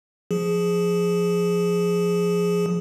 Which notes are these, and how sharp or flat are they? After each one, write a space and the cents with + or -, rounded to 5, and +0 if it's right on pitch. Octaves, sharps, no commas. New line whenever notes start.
F3 +0 G#4 +0